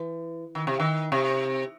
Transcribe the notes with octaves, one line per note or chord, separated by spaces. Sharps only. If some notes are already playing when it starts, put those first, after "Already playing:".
Already playing: E3
D#3
C3
D#3
C3